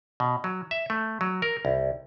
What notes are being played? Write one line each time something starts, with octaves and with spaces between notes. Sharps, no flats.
B2
F#3
E5
A3
F#3
A#4
C2